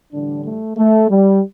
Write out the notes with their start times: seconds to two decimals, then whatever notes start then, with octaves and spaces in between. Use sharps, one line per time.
0.13 A2 D3 E3 G3 D4
0.45 A3
0.77 A3
1.09 G3